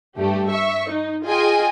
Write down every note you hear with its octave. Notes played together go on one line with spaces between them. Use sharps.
G2 A3 G4
E5 C#6
D#4
F4 G#4 D#5 G5 G#5